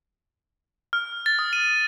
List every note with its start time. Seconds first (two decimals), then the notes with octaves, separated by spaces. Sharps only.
0.93 F6
1.26 A6
1.39 D#6
1.53 D#7